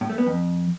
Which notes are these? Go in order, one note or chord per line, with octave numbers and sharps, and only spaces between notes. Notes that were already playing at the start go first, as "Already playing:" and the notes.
A2
A3
B3
F2